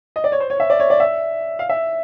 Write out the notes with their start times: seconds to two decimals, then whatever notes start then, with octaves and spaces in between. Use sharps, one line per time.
0.16 D#5
0.24 D5
0.32 C#5
0.40 C5
0.50 C#5
0.60 E5
0.70 D5
0.80 C#5
0.90 D5
1.00 E5
1.59 F5
1.69 E5